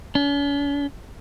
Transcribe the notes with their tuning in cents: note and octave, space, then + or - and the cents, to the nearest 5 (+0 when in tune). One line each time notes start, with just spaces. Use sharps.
C#4 +45